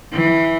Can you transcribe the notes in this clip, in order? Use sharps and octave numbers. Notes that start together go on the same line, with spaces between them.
E3